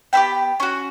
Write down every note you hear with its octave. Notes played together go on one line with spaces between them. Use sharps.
B3 E4 G4 G5 B5
C#4 F#4